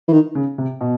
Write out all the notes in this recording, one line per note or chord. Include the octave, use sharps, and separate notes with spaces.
E3
D#3
C#3
C3
B2